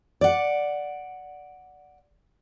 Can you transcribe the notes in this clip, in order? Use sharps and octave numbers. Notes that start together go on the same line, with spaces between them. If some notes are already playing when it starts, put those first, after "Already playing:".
D5 F#5